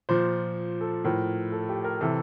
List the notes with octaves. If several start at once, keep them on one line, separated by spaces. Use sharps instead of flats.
A#2 F3 C5
A4
A2 F3 A#4
A4
G4
A#4
C3 E3 A4